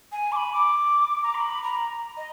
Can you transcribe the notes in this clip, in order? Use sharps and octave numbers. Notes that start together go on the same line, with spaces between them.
G#5
D6
B5
D6
A#5
D6
B5
A#5
D#5